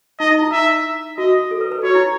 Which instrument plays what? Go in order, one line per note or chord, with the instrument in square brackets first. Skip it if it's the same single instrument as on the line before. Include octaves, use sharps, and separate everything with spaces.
[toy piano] D#4 [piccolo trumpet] D#5
[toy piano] D#4
E4
[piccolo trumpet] E5
[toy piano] F#4 [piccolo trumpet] D#5
[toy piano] A4
B4
B4
[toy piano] F#4 [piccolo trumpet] C#5
[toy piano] E4